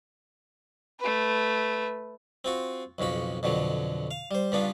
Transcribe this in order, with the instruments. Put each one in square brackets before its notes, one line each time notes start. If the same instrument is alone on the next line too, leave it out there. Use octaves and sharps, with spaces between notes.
[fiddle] A3 B4
[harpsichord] C4 F4 F#4
B1 F2 C#3 F#4 B5
F2 B2 D3 F#3
F5
G3 C5
G2 C#3 B3 D4 F4